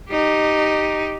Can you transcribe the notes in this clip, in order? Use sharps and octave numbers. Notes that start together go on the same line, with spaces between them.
D#4 G4